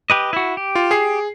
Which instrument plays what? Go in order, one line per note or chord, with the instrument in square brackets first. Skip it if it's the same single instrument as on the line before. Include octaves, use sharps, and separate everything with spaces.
[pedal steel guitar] G4 B4 D#5
E4 F#4
G4
[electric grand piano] F4
G#4 C7